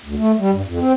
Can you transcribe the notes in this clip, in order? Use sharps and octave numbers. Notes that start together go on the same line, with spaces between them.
D2
A3
G3
G2
F2
C4